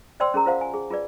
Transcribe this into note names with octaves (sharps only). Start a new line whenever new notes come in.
C5 D5 G5 C6 E6
C#4 G#4 A#4 A#5
F4 C5 F5 F#5
G#5
G#4
F4 G#4 B4 D5